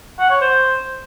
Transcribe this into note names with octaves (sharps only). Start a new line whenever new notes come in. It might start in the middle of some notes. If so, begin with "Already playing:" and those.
F#5
C#5
C5